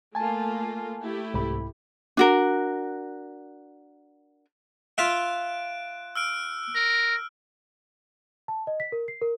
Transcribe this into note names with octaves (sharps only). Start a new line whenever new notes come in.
A3 A#3 F4 G#5 A5
A3 E4 G4
C2 G#2 B5
D4 F#4 A#4
F4 E5 F#6 D7
E6 F6 D7
A#4
A5
D#5
B6
A#4
C7
A#4